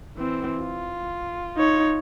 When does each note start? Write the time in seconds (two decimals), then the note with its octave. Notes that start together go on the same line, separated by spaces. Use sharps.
0.17 E3 C4
0.60 F4
1.57 D#4 C#5